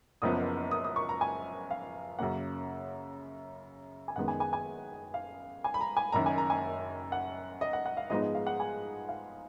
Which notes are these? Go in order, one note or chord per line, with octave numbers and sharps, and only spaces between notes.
F#1 F#2 F3 B3 D#6
D#6
D#6
C#6
A#5
G#5
F5
F#2 C#3 F#3 A#3 C#4 F#5
G#5
F#1 F#2 D#3 G#3 B3 F#5
G#5
G#5
G#5
F5
G#5
B5
A#5
G#5
F#1 F#2 D#3 A#5
G#5
A#5
G#5
F#5
D#5
F#5
F#5
F5
G#2 F3 G#3 B3 D#4 D#5
D#5
F5
F#5
G#5
F5